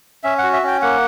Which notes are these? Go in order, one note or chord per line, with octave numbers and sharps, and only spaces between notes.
C#4 E5
F#4 F#5
E5
C#4 G5
A#3 F#5